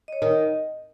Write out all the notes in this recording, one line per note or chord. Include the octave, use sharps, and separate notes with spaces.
D#5
C#5
D#3
D#5